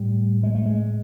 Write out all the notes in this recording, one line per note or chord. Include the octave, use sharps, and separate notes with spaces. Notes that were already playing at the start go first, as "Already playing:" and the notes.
Already playing: A2 G3
G#3
A3
G#3